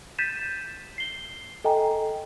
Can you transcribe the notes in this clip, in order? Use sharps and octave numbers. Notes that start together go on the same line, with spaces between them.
G6 A6 B6 D#7 E7
C7 G7
A4 D#5 G5 G#5 A#5